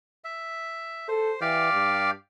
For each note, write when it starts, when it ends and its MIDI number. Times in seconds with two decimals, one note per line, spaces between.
0.24 1.08 76
1.08 1.33 69
1.08 1.40 72
1.41 1.71 52
1.41 2.11 67
1.41 2.11 74
1.41 2.11 77
1.73 2.12 43